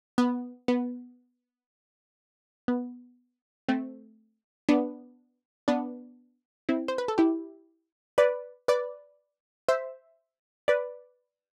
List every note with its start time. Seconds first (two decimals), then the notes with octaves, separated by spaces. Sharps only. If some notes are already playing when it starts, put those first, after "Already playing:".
0.18 B3
0.68 B3
2.68 B3
3.69 A3 C4
4.69 B3 D4
5.68 B3 D4
6.69 C4 E4
6.88 C5
6.98 B4
7.08 A4
7.18 E4 G4
8.18 B4 D5
8.68 B4 D5
9.68 C5 E5
10.68 B4 D5